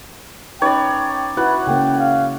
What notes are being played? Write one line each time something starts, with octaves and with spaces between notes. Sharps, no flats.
C#4 D#4 B4 C#5 D5 G5
E4 F#4 B4 F#5
C#3 A#3 G5
F5